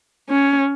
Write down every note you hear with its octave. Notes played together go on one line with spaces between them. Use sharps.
C#4